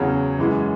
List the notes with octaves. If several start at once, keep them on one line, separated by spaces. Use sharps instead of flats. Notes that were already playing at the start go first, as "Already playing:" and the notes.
Already playing: E2 C#3 F#3
F#2 E3 G#3